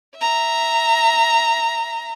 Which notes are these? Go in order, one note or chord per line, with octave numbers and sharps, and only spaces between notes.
E5 A#5